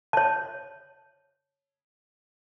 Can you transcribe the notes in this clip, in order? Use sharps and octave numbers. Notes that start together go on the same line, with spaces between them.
C#5 A5